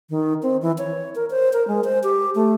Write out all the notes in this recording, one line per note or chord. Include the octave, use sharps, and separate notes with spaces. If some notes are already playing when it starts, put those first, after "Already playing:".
D#3
C4
E3
C#5
A#4
C5
A#4
G#3
C5
G4
A3